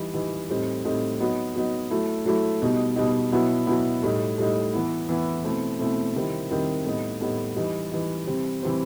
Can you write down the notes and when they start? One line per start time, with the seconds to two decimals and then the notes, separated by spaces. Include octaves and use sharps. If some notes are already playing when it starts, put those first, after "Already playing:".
Already playing: E3 G3 D#4
0.14 E3 G3 D#4
0.49 A2 G3 C4 D#4
0.84 A2 G3 C4 D#4
1.20 F#3 B3 D#4
1.56 F#3 B3 D#4
1.91 F#3 A3 E4
2.26 F#3 A3 E4
2.62 B2 G3 D#4
2.96 B2 G3 D#4
3.32 B2 F#3 B3 E4
3.67 B2 F#3 B3 E4
4.03 A2 G3 D#4
4.38 A2 G3 D#4
4.74 E3 B3 E4
5.09 E3 B3 E4
5.44 B2 A3 C4 E4
5.79 B2 A3 C4 E4
6.15 C3 D#3 G3 C4 E4
6.50 C3 D#3 G3 C4 E4
6.85 A2 G3 B3 D#4
7.21 A2 G3 B3 D#4
7.56 E3 G3 D#4
7.92 E3 G3 D#4
8.27 C3 E3 G3 C4
8.63 C3 E3 G3 C4